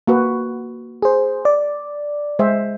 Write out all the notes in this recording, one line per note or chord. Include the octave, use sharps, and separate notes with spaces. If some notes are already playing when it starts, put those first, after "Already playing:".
A#3 F#4 B4
G#4 C5
D5
G#3 C5 E5